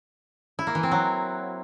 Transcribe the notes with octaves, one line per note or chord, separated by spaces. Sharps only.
E4
A#3
E3
C4
F#3